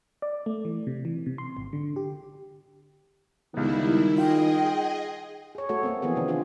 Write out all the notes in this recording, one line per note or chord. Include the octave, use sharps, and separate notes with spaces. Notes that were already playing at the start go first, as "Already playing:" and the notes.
D5
A3
E3
C3
E3
C3
C6
G#1
D3
G4
C#2 D#3 G3 B3 E4
F4 G#4 D#5 G5
G#4 C#5
A3 F#4 A4 C#5
A3 A#3 C4
E3 F3 B3 G#4
C3 D#3 C4 D4
D4 D#4 F4 G#4